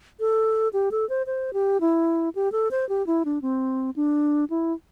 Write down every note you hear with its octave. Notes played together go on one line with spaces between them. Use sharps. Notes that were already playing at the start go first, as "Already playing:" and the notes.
A4
G4
A4
C5
C5
G4
E4
G4
A4
C5
G4
E4
D4
C4
D4
E4